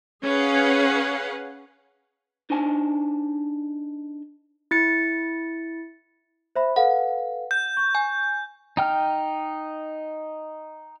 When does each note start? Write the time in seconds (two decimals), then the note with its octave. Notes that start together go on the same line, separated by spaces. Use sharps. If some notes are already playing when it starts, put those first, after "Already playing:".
0.24 C#4 G#4 B4 F5 F#5
2.50 D4 D#4 C5 G#5 A5
4.71 E4 A6 C#7
6.56 C5 E5 B5
6.76 A4 B4 F5 F#5
7.51 G6
7.77 C#6
7.95 G#5
8.77 D#4 G5 F6